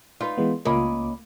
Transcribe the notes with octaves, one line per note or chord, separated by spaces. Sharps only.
D#4 F4 B4
E3 G#3 B3
C#2 A#3 C#4 F4 D#5 B5 D6